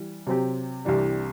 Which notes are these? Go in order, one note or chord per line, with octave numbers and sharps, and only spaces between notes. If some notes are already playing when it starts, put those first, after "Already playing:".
Already playing: E3 G3
C3 F#3 C4 G4
C2 C3 E3 G3 D4